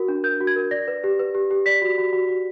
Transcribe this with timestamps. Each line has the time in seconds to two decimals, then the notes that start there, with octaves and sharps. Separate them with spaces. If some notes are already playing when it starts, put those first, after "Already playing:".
Already playing: F#4 A#4
0.08 D4
0.24 A#4 G6
0.40 F#4
0.47 G#6
0.56 A#4
0.71 D5 A#6
0.88 B4
1.04 G4
1.19 B4
1.35 G4
1.51 G4
1.66 D5 B6
1.82 F#4
1.98 F#4
2.13 F#4
2.29 F#4